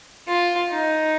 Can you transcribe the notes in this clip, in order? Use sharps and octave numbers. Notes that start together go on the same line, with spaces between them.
F4
D#4